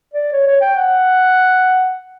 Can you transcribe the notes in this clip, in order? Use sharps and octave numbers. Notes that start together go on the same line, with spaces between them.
D5
C#5
C#5
G5
F#5